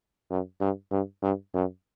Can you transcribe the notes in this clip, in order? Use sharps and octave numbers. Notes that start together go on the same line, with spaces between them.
F#2
G2
G2
G2
F#2